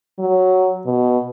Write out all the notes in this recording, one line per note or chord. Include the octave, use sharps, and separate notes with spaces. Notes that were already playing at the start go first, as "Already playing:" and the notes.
F#3
B2